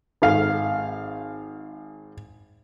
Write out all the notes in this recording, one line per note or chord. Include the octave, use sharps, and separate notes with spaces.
G#1 F5